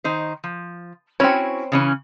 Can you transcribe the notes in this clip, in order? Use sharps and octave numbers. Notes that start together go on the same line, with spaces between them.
D#3 D#4 C5
F3
C4 C#4 E4 F#4 C#5
C#3 E3 C#4